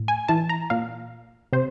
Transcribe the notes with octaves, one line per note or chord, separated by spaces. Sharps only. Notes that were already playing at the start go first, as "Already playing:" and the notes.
Already playing: A2
G#5
E3 A5
A#5
A#2 F5
C3 C5